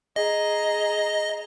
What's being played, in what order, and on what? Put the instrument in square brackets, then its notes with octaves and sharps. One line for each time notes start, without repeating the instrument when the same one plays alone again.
[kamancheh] G#4 A#5 [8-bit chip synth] D#5